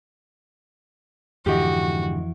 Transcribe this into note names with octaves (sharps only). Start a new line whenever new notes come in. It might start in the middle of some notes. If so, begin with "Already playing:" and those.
F2 G#2 D3 E3 F#4 G4 D#5